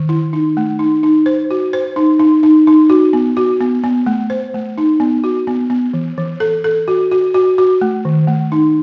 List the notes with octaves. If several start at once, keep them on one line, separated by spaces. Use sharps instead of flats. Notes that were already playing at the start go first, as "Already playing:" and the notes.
Already playing: D#3
E4
D#4
A3
D#4
D#4
C5
F#4
C5
D#4
D#4
D#4
D#4
F#4
B3
F#4
B3
B3
A3
C5
A3
D#4
B3
F#4
B3
B3
E3
E3
A4
A4
F#4
F#4
F#4
F#4
A3
D#3
A3
D#4